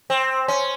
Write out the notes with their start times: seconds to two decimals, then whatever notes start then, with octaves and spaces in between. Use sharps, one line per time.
0.10 C4
0.48 C#4